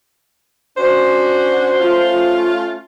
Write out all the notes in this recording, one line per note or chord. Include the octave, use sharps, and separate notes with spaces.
C#4 D4 F#4 C5
A3 C#4 F4